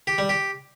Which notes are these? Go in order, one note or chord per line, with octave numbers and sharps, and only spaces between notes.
G4
G3
G4